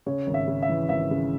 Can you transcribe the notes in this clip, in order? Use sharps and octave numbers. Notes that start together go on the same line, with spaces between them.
C#3 C#5
G#1
E5
C#3
E5
E3
G#1 E5
C#3